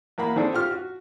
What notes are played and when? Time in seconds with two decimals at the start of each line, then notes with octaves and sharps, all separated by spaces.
0.18 E2 A#3 F#5 B5
0.36 D#3 C4 D4 G#4 A4 D5
0.53 F4 G4 C#6 F6
0.71 F#4